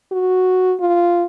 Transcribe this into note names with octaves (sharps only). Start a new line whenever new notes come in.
F#4
F4